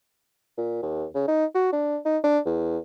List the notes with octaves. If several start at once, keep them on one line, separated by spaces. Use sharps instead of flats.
A#2
D#2
C#3
D#4
F#4
D4
D#4
D4
E2